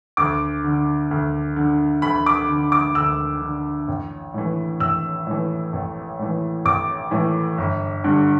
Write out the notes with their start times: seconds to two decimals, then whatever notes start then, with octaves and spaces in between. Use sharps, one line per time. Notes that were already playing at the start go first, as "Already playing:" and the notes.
0.17 D2 D6
0.64 D3
1.11 D2
1.56 D3
2.02 D2 B5
2.26 D6
2.49 D3
2.72 D6
2.95 D2 E6
3.41 D3
3.88 A1
4.34 A2 E3
4.80 A1 E6
5.27 A2 E3
5.73 A1
6.19 A2 E3
6.65 A1 D6
7.11 A2 E3
7.58 G1
8.04 G2 D3